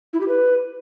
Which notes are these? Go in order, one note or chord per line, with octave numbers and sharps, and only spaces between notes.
E4
G4
B4